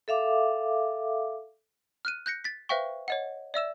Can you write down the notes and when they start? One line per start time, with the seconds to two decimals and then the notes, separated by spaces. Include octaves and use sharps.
0.08 A4 E5 F5 D6
2.05 F6 F#6 D#7
2.26 F#6 G6 A#6 C#7
2.44 A6 B6
2.69 B4 C5 E5 F5 G5 C#6
3.08 C#5 D#5 F#5
3.54 D5 E5 E6 E7